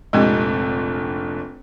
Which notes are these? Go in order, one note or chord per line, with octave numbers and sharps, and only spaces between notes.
F1 A#1 G#3 C4 G4